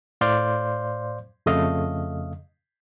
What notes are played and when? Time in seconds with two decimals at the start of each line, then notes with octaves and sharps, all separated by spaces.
0.21 A2 C5 D5 F5 C6 G6
1.46 F2 C#3 A3 D#5 F5